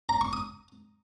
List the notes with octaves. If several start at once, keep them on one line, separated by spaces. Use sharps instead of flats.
A#5
C#6
D#6